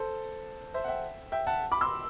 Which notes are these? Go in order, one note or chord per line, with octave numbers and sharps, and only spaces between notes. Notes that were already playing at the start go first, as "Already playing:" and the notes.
Already playing: A4 C5
C5 E5
F#5
E5 G5
E5 G5
F#5 A5
B5 D6
C6 E6